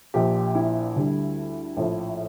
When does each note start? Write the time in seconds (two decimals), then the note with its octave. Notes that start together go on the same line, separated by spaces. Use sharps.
0.14 A#1 A#2 F3 G4
0.55 E4
0.96 D2 D3 G3
1.77 A#1 A2 F3